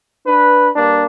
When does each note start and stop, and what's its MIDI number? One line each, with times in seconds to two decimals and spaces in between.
0.25 0.69 62
0.25 0.69 71
0.76 1.06 43
0.76 1.06 58
0.76 1.06 62